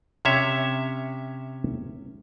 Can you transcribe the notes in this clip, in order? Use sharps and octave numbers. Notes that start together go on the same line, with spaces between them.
C3 C#4 C#5 E5